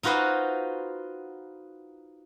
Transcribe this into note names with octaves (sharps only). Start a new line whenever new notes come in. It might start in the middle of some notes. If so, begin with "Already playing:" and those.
D#4 F4 F#4 B4 C5